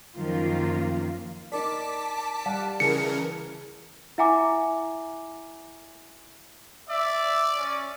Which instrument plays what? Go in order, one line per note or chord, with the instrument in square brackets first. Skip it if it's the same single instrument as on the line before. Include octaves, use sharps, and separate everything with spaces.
[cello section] F#2 D#3 F3 A#3 F4
[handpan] D#4 A#4 D5 [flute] A5 [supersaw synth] D6 B6
[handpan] G3 F5 F#5
[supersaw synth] C#3 E3 A#4 [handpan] G#4 [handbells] C#7
[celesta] E4 E5 F#5 G#5 A#5 D6
[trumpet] D5 [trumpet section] E5
[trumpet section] C#4